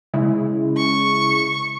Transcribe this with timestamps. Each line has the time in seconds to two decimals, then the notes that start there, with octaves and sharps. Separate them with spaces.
0.14 C#3 G#3 E4
0.76 C#6